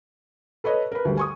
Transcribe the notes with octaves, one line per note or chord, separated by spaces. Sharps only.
A4 B4 C#5 D#5
A#4 B4
D2 G3
G#5 C#6 D#6